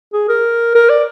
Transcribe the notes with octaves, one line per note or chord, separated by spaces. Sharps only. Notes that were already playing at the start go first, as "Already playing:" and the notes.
G#4
A#4
A#4
D5